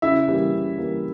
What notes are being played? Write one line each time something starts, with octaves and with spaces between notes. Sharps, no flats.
C#3 E4 E5
E3 G3 A#3
C#3
E3 G3 A#3